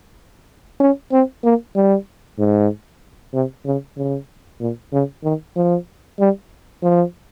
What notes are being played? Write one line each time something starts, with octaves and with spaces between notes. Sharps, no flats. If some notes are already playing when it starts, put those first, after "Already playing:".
C#4
C4
A#3
G3
G#2
C3
C#3
C#3
A#2
C#3
D#3
F3
G3
F3